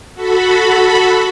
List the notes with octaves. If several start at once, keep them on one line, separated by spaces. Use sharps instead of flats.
F#4 A4 B5